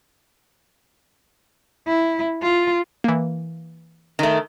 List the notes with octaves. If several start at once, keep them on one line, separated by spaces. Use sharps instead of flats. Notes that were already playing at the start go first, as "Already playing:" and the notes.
E4
F4
E3 A#3
D#3 A3